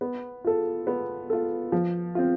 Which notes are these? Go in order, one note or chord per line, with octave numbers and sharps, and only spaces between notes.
B3
F4 A4
B3
F4 A4
F3
C4 F4